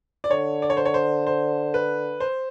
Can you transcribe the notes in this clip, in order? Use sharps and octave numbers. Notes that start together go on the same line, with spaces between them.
D5
D3 C#5
D5
C#5
C5
C#5
C5
C5
B4
C5